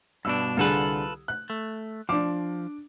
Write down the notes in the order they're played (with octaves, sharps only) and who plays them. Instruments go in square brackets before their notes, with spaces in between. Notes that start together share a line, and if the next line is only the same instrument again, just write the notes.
[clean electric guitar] G2 B2 D4 [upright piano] E6
[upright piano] C2 D3 G#4 [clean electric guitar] F4 A4 B4
[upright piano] F#6
[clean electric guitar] A3
[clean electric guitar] F3 [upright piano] D4 D6